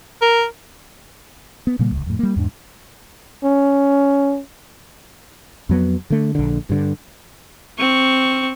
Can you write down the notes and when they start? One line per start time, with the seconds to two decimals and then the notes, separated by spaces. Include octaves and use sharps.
0.22 A#4
1.67 B3
1.79 A#2 C#3 G3 A#3
1.92 D#1 C#2
2.06 F2 A2
2.19 G3 A#3
2.36 E2 G#2 D4
3.43 C#4
5.69 F2 F#3 B3
6.10 D3 A3
6.35 A#1 D3
6.70 G2 D3
7.79 C4 C#6